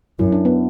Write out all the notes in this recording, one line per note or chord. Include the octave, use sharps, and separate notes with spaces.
F#2 E4
D4
B3